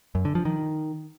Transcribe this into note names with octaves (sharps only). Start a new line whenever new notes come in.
F#2
D3
F3
D#3